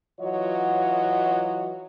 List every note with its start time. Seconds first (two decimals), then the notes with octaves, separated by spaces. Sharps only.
0.21 E3 F#3 F4 F#4 C#5 D#5